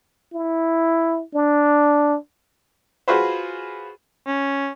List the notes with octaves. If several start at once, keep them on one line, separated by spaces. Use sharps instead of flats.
E4
D4
F4 F#4 G#4 B4 C5
C#4